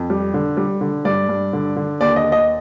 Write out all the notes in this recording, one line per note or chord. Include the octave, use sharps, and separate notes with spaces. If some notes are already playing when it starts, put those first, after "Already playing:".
Already playing: F2
G3
D3
G3
D3
G2 D5
G2
D3
D3
D#2 D5
D#5
D#2
D#5